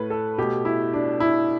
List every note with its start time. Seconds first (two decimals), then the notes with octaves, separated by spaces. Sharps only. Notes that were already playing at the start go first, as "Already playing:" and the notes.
Already playing: A2 A3 B4
0.10 A4
0.38 B2 A3 G4
0.65 E4
0.94 D4
1.20 E4